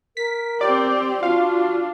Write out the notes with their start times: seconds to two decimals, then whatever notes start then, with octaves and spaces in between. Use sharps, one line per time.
0.17 A#4 B6
0.61 C4 G4 D5 C6
1.23 D4 F4 F#4 F5